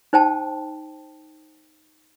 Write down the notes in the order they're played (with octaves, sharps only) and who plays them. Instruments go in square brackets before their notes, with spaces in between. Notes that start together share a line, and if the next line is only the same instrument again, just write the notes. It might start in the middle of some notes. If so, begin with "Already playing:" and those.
[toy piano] D#4 C5 G5 A5